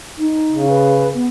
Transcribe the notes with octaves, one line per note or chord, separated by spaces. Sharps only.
D#4
C#3
B4
B3